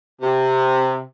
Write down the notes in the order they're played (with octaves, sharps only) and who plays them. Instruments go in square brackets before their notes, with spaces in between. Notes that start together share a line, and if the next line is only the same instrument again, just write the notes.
[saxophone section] C3